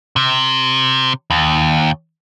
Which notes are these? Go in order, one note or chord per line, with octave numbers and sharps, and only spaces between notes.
C3
D#2